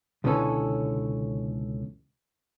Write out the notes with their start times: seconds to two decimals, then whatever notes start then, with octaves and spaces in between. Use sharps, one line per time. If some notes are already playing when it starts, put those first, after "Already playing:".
0.24 C#2 B2 D3 E3 C#4 A4